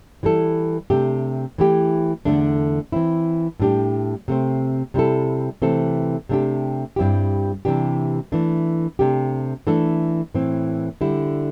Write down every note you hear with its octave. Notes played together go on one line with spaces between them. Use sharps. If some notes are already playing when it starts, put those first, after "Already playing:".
E3 G3 E4 A4
C3 A3 D4 G4
E3 A3 E4 G4
E2 D3 A3 D4
E3 C4 E4
A2 G3 D4 G4
C3 A3 C4
C3 G3 E4 A4
C3 E3 A3 C4 A4
C3 A3 D4 G4
G2 G3 C4 E4 G4
C3 E3 G3 D4 G4
E3 A3 D4
C3 A3 D4 G4
E3 A3 D4 A4
A2 E3 C4
D3 G3 E4